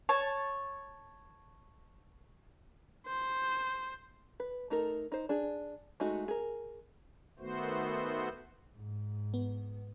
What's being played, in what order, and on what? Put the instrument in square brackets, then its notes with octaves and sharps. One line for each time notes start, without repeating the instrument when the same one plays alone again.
[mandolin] C#5 A5
[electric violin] C5
[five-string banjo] B4
A3 D#4 A4 A#4
D#4 C5
D4 G#4
G#3 A3 D#4 F#4
G#4 A#4
[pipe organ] D#3 A3 B3 F#4 C5
[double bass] G#2
[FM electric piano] B3